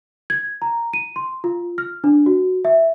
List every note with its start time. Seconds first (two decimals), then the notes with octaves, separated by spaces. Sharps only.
0.30 G#6
0.62 A#5
0.93 D#7
1.16 C6
1.44 F4
1.78 F6
2.04 D4
2.26 F#4
2.65 E5